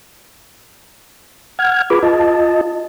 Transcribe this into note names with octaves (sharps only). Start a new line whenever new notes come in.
F#5 F6 G#6
F4 G#4 B4 B5 D6
F4 D#5 A5